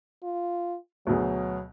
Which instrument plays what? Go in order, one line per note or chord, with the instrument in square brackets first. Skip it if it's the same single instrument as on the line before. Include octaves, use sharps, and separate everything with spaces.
[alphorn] F4
[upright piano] D2 B2 G#4 [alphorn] F#3